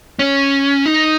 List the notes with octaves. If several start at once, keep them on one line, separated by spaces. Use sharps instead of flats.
C#4
D#4